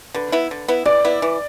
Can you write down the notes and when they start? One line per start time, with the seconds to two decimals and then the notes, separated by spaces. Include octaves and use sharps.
0.14 D3 B4
0.32 B3 E4
0.51 D3
0.68 B3 E4
0.85 E3 D5
1.05 B3 E4
1.22 E3